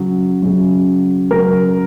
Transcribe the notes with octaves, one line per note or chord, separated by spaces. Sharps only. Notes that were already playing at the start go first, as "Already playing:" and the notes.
Already playing: C#3 F#3
C#3 F#3
C#3 F#3 A#4